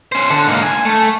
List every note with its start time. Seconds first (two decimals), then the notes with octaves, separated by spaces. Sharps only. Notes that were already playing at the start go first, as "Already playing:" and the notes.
0.12 C#4 C5
0.30 D3
0.47 G#2 A#3
0.63 G#5
0.85 A3